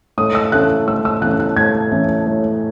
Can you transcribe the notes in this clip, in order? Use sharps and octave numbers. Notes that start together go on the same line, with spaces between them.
A2 D#6
E6
E3 A3 C#4 F#6
A2 E6
E6
E3 A3 C#4 F#6
F#6
A2 G#6
E3 A3 C#4
A2